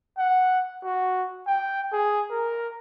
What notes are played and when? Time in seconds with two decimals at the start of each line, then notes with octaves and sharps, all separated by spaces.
0.18 F#5
0.84 F#4
1.47 G5
1.92 G#4
2.31 A#4